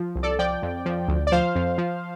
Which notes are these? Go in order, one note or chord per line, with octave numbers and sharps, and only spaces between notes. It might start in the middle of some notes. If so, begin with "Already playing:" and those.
Already playing: F3
C2
A4 D5
F3 D5 G5
F2
F3
D2
D5
F3 C5 F5
F2
F3